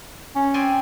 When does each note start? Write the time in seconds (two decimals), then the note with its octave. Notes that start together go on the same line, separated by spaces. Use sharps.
0.35 C#4
0.54 C4 D5 G#5